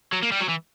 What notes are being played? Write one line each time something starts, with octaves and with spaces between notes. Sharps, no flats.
F#3
A#3
G3
F#3
E3